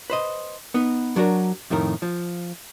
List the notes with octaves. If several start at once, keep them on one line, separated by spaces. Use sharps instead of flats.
B4 C5 D#5
B3 D#4 B4
F#3 D4 F#4 A#4
F2 A2 D#3 G#4 A#4
F3